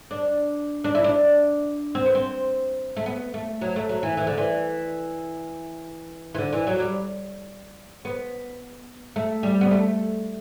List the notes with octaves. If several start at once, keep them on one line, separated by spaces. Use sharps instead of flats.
D4
D4
E4
D4
C4
B3
C4
A3
B3
A3
F#3
A3
F#3
E3
E3
D3
E3
E3
D3
E3
F#3
G3
B3
A3
G3
B3
A3